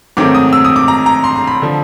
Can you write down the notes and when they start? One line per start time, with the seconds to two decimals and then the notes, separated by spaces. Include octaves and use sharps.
0.17 G#2 D#3 F#3 A3 C4 D6
0.35 D#6
0.53 E6
0.65 D#6
0.76 D6
0.88 A#5
1.06 A#5
1.24 C6
1.36 C6
1.47 B5
1.62 D3 F3